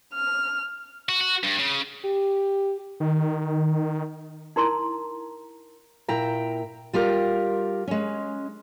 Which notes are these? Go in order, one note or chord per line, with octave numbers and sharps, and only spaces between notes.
F6
F#4
F#4
G2
C#3
G4
D#3
D#4 E4 A#4 A#5 C6
A#2 E4 G5 A#5
G3 F4 G4 A#4
G#3 C#4